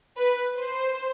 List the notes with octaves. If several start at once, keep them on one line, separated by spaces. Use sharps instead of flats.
B4
C5